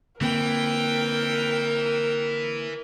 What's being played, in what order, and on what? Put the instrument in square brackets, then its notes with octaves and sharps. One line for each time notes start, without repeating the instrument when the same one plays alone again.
[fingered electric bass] D3 A#3 C4 [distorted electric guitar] E3 [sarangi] A#4 [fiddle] G5